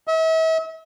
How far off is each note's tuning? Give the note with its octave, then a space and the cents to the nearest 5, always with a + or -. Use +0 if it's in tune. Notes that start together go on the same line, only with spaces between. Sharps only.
E5 -40